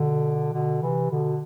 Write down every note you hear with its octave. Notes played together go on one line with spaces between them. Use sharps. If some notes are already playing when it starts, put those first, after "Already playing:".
Already playing: B2 D3
B2 D3
C3 E3
B2 D3